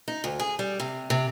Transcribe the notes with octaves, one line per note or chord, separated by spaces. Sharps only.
D#4
D2
G#4
G3
C3
C3